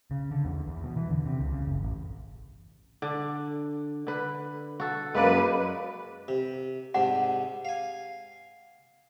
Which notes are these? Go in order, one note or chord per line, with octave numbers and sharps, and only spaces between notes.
C#3
D3
E2
E2
B2
E3
D3
C3
C#2
C#3
F#1
A1
D3 D4
D3 B4
F#4 A4
F#2 G#3 A#3 B4 D5
C3
G#2 C3 D4 F#5
F5 G#5